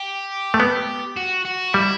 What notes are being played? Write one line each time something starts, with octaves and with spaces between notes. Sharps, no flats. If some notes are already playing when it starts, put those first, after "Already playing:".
Already playing: G4
A3
B3
F#4
F#4
G3 E4